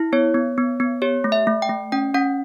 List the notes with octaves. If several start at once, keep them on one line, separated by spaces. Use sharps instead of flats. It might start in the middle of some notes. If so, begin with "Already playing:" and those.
Already playing: E4
B3 C#5
B3
B3
B3
G4 C#5
A3
E5
A3
G5
A3
C#4 G5
C#4 F#5